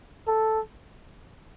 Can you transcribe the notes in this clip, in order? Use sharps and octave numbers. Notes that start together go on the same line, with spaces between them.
A4